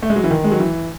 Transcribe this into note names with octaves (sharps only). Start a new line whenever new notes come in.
A3
G#3
F#3
E3
D#3
G#3
F#3
E3